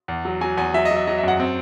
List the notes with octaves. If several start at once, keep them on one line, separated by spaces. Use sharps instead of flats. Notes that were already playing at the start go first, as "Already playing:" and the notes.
E2
F#3
F#3 G#5
E2 G#5
F#3 E5
D#5
F#3
E5
F#3 D#5
E5
F#2 F#5
C4